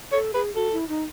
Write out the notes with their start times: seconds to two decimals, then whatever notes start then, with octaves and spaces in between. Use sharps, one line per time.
0.12 A4 C#5
0.34 G#4 B4
0.55 F#4 A4
0.72 E4
0.89 D#4